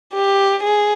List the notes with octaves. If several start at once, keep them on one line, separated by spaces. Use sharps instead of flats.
G4
G#4